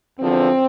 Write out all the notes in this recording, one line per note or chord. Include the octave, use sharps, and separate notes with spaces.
E2 D3 F3 C4